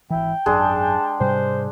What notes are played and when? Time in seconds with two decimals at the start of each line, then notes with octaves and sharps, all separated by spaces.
0.10 G#1 E3 E4 G5
0.46 G#1 F#2 G#3 D4 G#4 A5
1.20 G#2 C3 G3 C5